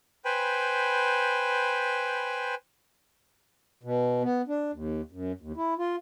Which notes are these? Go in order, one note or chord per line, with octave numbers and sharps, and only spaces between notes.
B4 C5 G5 G#5 B5
B2
B3
D4
D#2
F#2
D#2
E4
F4